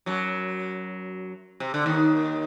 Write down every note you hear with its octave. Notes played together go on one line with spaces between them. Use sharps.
F#2 F#3
C3
D3
D#2 D#3